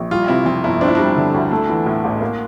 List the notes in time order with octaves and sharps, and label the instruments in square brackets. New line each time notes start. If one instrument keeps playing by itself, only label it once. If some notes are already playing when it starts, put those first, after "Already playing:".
Already playing: [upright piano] A#1
[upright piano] G3 [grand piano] F4
[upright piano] C3 [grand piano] E4
[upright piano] F2 [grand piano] F4
[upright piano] G1 [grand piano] E4
[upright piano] C4 [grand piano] D4
[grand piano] E4
[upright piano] G3 [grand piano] D4
[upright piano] D3
D2
A3
E3
A2
A1
A#3